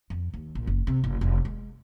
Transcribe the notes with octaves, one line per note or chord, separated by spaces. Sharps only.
F2
D#2
A#1
F#1
C3
F#1
F1
G#3